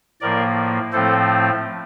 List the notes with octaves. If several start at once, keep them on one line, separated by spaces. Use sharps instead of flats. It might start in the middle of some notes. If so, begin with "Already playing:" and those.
A2 F3 A#3 A#4 D5
A2 F3 A3 C4 A4 C5